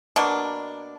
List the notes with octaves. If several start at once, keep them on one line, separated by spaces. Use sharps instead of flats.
B2 A#3 D4